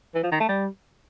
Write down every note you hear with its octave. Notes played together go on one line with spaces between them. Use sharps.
E3
F3
D#3
A3
G3